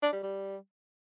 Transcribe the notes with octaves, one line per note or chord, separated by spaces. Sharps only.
D4
G3
G3